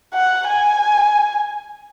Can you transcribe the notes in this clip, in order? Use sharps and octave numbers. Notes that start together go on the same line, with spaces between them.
F#5
G#5